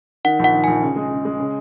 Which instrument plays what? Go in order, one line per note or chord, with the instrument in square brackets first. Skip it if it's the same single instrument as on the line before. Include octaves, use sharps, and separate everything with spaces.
[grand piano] D#3 [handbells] F#5
[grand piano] A#1
[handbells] F#5
[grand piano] D#3
[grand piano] A#1 [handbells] G#5
[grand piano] C#3
G#3
C#3
G#3
C#3